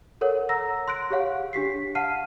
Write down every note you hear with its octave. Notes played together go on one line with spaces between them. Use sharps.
A4 A#4 C#5 F#5
F#5 A#5 E6 A#6
C6 F#6 D7
G4 G#4 C#5 F5 F#5
D4 G4 B6 C7
F5 F#5 A5 F6 C7 D#7